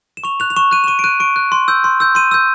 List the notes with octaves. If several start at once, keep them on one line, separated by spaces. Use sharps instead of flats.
E7
C#6 F7
F#6 F7
F7
C#6 E7
F#6 D#7
E7
C#6 D#7
D7
F#6 D#7
C#6 D7
F#6
C6
E6 G6
C6
E6 G6
C6 D#7
E6 G6